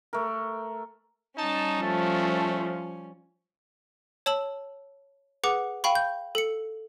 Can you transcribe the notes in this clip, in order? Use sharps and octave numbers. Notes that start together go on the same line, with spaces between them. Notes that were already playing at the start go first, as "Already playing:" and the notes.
A3 A#4
G3 C#4 D#4 A5
F3 A3
C#5 A5 E6 F#7
G#4 B4 F#5 D6
F5 G5 B5 C#6
G6
A4 C#7